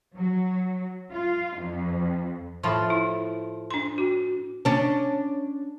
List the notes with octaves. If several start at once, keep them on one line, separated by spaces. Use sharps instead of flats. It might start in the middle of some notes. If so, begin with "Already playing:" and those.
F#3
F4
F2
A2 F3 F4
E4
D4 C6
F#4
C#4 D4